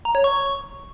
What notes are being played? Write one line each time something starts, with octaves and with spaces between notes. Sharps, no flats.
A#5
C#5
C#6